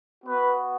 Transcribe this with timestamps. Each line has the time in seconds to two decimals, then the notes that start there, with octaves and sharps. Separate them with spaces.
0.25 B3 F#4 B4